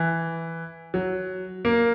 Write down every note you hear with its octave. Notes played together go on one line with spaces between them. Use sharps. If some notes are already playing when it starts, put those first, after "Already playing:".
Already playing: E3
F#3
A#3